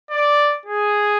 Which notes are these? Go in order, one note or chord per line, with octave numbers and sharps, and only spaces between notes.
D5
G#4